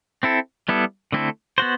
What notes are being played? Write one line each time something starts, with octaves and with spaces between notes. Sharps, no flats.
C4 E4 A4
G3 B3 E4 A4
D3 A3 C4 E4 A4
B3 F#4 C5